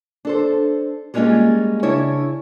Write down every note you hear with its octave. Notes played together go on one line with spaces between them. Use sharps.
D4 A4 C5
G3 G#3 A#3 C#4 F4 G#4
C#3 D4 E4 C#5